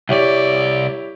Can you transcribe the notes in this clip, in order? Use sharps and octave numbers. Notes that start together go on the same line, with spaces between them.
C2 E4 G4 C#5 D5